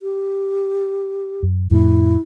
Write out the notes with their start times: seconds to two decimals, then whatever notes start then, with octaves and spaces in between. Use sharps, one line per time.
0.01 G4
1.43 F#2
1.71 F2 A2 A3 E4